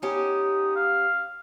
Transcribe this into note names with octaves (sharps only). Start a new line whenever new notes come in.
B3 C#4 D#4 G4
F5